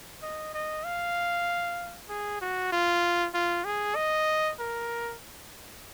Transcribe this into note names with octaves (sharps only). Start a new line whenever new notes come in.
D#5
D#5
F5
G#4
F#4
F4
F4
G#4
D#5
A#4